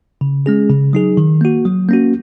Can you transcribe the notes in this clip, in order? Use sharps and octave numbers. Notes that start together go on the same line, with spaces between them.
C#3
G#3 C#4 G#4
C#3
F#3 D#4 G#4
D#3
A#3 F#4
F#3
A#3 C#4 F#4